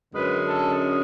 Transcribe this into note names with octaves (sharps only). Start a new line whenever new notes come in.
F#2 D3 G#3 C#4 B4
A4